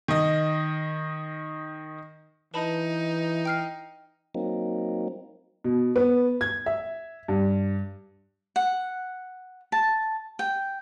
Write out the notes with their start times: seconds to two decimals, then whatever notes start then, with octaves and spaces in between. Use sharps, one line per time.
0.08 D#3 D#5
2.54 E3 D#4 B4 A5 B5
3.45 G5 F6 C7
4.35 F#3 A#3 C4 D#4
5.64 B2
5.96 B3
6.41 G#6
6.66 E5
7.28 G2
8.56 F#5
9.72 A5
10.39 G5